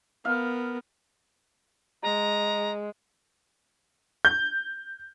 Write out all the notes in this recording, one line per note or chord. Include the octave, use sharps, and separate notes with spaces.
B3 A#4 F5
G#3 A#5
G6